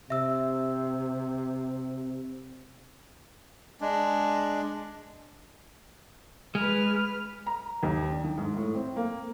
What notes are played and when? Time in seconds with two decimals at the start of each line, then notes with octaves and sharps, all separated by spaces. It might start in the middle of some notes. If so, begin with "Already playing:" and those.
0.10 C3 E5 E6
3.81 G#3 D4
6.55 G#3 B4 F6
7.46 A#5
7.83 D#2
8.12 D4
8.24 D#3
8.37 G#2
8.56 A2
8.75 C4
8.96 A#3